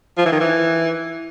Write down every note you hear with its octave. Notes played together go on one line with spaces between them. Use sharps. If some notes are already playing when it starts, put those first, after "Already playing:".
F3
E3
D#3
E3